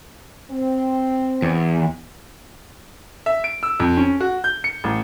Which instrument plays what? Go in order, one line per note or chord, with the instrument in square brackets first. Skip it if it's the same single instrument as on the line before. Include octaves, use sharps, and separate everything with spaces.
[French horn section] C4
[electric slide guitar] E2
[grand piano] E5
D7
E6
F2
C#4
F#4
G6
C#7
A1